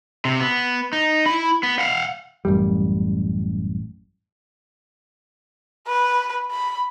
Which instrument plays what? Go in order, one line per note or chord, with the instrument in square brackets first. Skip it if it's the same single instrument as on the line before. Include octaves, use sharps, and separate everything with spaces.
[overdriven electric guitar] C3
B3
D#4
E4 B5
B3
F5 F#5
[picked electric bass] A1 F#2 G3
[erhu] B4
B5